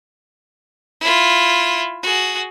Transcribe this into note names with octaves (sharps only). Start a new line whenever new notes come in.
E4 F4
F#4 G#4